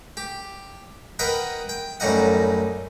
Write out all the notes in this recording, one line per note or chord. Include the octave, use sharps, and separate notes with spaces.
G4
A#4 B4 D#5 F#5 G5 B5
G5
F#2 A2 G3 D#4 D#5 F#5